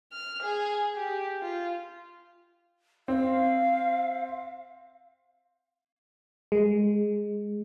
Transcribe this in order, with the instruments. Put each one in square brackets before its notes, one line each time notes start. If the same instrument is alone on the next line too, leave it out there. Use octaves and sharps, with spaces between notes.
[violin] F6
G#4
G4
F4
[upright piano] C4 [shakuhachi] F5
[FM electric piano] G#3